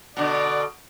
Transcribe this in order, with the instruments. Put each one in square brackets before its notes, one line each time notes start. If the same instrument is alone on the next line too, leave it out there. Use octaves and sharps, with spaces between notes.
[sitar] B2 D3 [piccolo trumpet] D5